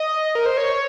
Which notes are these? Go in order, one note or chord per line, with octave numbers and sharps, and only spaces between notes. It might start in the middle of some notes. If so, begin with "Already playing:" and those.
Already playing: D#5
A#4
C5
C#5